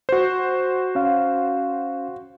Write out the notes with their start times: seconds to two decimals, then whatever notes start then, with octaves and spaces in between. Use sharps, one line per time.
0.09 F#4 C5
0.95 C#4 F5